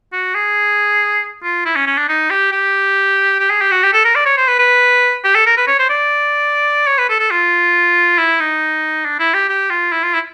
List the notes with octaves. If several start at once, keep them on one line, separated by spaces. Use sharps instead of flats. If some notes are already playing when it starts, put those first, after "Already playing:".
F#4
G#4
F4
E4
C#4
C#4
D4
D#4
G4
G4
G4
G#4
G4
F#4
G4
A4
A#4
D5
C#5
C5
B4
B4
G4
A4
A#4
B4
C#5
C5
D5
C#5
B4
A4
A4
F4
E4
D#4
D4
E4
G4
G4
F4
E4
F4
E4